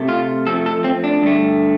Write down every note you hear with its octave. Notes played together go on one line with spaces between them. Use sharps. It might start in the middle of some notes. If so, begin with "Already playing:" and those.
Already playing: C3 A3
F4
F2 F3 A3 A4
A4
C4
D4
G2 D3 A3